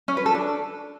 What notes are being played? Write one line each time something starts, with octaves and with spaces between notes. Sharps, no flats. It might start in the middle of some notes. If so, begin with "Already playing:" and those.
C#4
B4
A4
D4